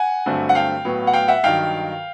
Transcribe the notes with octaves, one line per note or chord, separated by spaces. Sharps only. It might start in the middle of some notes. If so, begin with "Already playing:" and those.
Already playing: F#5 G#5
G2 D3 F#3 A3 C4
F#5
F5 G5
A2 F#3 B3
F#5
F5 G5
E5 F#5
G2 D#3 F#3 F5 G5